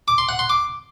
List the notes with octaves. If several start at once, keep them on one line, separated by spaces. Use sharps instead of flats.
D6
C6
F#5
C6
D6